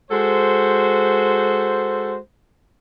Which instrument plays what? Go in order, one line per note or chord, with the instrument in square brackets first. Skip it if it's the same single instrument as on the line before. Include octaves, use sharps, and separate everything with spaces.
[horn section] G#3 F#4 A4 C5